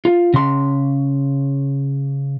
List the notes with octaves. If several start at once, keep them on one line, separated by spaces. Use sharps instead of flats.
F4
C#3 C6